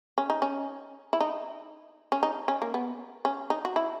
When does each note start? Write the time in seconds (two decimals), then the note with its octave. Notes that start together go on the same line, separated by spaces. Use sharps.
0.18 C#4
0.30 D#4
0.42 C#4
1.13 E4
1.21 D#4
2.12 C#4
2.23 D#4
2.48 C#4
2.62 A#3
2.74 B3
3.25 C#4
3.50 D#4
3.65 F#4
3.76 E4